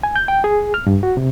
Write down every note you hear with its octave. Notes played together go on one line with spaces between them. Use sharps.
G#5
G6
G5
G#4
F6
G2
F#4
C3